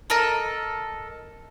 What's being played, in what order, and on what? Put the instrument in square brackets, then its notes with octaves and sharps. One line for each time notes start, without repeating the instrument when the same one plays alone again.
[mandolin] A4 A#4 D#5